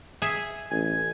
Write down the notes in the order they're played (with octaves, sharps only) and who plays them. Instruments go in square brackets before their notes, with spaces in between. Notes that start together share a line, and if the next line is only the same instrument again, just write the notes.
[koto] G#4 E5
[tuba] A1 [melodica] G#5